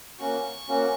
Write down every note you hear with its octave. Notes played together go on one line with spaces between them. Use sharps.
A#3 C#4 F#4 C#6
A#3 C#4 F#4